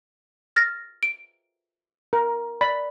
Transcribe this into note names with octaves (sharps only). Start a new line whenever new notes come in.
F6 A6 A#6
D7
A#4
D5 B5